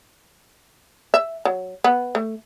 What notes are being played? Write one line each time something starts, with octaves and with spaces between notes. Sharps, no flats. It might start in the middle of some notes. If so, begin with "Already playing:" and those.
E5
F#3
B3
A3